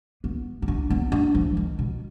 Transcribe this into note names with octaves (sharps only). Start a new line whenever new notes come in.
B3
D#4
D4
B3
D4
F3
D#3
B2